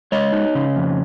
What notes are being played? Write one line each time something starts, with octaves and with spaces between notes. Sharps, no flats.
G#3 C#5 D#5
D#4
C#3
F2